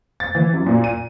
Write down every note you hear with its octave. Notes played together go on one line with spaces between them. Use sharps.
A6
E3
F#2
A#2
D#7